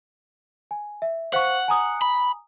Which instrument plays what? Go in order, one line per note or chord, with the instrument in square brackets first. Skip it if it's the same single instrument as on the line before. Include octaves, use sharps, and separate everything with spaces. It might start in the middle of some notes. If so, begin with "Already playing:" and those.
[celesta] G#5
E5
[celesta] C5 F5 C#6 [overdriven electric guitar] F#5
[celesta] G#5 A#5 D#6
[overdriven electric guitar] B5